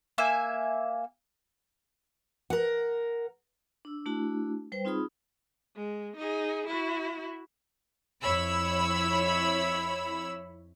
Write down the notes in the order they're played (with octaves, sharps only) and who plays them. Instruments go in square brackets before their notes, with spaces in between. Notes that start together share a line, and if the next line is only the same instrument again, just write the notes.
[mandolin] A#3 E5 G#5
[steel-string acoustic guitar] A#4 F#5
[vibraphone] D4 E6
A3 D4 E4 F#4 A5
G3 B4 C5 G5
C4 D#4 F4 G#4 B5 D#6
[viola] G#3
D#4 G#4
E4 F#4
[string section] F2 E4 C#5 B5 E6